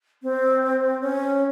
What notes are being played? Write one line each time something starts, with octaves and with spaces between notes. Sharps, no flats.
C4
C#4